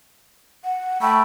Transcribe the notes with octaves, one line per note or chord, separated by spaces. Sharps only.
F#5
A3 G5 B5